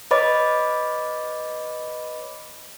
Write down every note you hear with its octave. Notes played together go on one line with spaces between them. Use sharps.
B4 C#5 D#5 B5 D6 A6